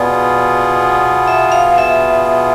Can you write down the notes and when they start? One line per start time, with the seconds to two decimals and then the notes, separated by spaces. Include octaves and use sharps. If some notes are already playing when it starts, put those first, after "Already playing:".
Already playing: B2 B3 F4 G#4 D5
1.28 E5
1.52 F5
1.78 E5